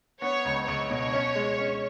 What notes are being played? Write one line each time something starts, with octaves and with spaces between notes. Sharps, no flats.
B3 C#5
C#2
C#2 C#5
B2
C#4
G#3
C#4